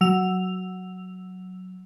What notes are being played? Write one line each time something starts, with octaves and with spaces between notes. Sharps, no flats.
F#3 E6 F7